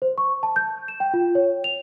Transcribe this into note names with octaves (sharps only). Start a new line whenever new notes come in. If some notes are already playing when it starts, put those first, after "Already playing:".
C5
C#6
A5
G6
E7
G5
F4
C#5
F7